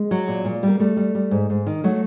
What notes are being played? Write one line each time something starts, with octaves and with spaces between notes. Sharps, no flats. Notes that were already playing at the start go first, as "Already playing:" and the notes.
Already playing: G#3
F#3
A#2
A#2
G3 A#3
G3 A3
G3
G3
G#2
G#2
D#3
F#3 A3